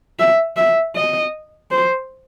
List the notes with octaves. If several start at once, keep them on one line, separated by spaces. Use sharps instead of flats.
E5
E5
D#5
C5